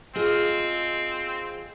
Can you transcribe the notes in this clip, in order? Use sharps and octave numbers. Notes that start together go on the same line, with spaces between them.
C4 F4 G#4 D#5